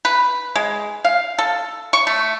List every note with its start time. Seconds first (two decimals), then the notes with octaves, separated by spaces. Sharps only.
0.05 B4
0.56 G#3
1.05 F5
1.39 A4
1.93 C#6
2.07 A3